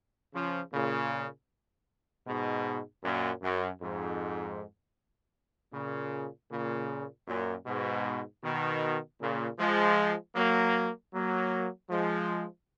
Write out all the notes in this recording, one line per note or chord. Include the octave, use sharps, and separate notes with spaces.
C#3 F3
A#2 C#3
G#2 B2
F#2 A#2
F#2
F2 G#2
A#2 C#3
A#2 C#3
F#2 A#2
G#2 B2
B2 D#3
A#2 C#3
F3 G#3
F#3 A#3
F#3 A#3
F3 G#3